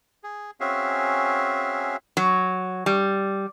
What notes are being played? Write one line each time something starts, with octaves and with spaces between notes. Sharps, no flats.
G#4
C4 C#4 F#4 G#4 E5 F5
F#3
G3